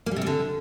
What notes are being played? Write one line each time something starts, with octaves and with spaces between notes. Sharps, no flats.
A#3
G3
C3
G3
D3